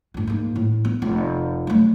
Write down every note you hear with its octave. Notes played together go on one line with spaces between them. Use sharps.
D2 G2
G#2 A#3
A2
B3
F1
F#3 A3